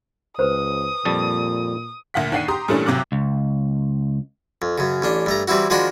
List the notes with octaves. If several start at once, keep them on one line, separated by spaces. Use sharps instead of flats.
C#2 B4 C5 D#6
F2 A#2 G3 A5
D2 A#2 F#5 B6
D#2 D4 F#5 C7 D#7
G4 A#5 C6 D#6
A#2 E3 G3 A3 C#4 D4
F1 C3 F#3 D6 F#6
C#2
F2
F#2 C#3
A1 C#4 D4
G2 A3 A#5
E3 G3 C4 E4 F#4
D#3 F3 G#3 D4 F#4 B5